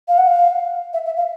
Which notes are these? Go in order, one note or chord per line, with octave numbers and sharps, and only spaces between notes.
F5
F#5
F5
E5
E5
F5